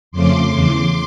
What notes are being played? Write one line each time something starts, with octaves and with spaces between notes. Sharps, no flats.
F2 C#3 F3 A3 C#4 C6 D6
E2 C#3 E3